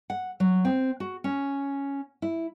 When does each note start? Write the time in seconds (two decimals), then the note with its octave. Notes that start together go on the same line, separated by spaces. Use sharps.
0.10 F#5
0.40 F#3
0.65 C4
1.00 F#4
1.24 C#4
2.22 E4